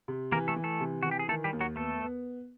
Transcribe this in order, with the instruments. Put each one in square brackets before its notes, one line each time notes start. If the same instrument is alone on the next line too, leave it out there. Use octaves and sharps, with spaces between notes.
[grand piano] C3
[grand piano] E3 [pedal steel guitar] A#3 A#4
[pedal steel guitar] A3 A4
[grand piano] E3
[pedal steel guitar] A3 A4
[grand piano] C3
[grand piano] E3 [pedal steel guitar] F#4
[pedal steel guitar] G4
G#4
[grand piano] D#3 [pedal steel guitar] A3 A4
[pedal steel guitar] G3 G4
[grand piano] D#2
[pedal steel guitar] F#3 F#4
[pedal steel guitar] A3 A4 [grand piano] B3
[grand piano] B3